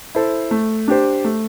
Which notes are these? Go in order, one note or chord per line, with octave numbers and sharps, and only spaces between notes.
E4 A4 C5
A3
D4 G4 C5
A3